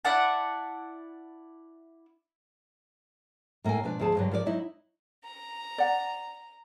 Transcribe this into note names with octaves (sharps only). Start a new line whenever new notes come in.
E4 D5 F#5 A5
A2 A#3 A4 A#4 G#5
B2 F3 B3 D4
D2 F3 G#4 A5
G2 D3 F#3
F3 A#4 B4 D5
F#3 D#4 E4
A#5
D5 F#5